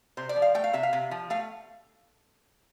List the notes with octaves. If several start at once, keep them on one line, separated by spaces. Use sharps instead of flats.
C3 C5
D5
F3
F5
A3 G5
F5
C3 E5
F5
C3
F3
A3 F5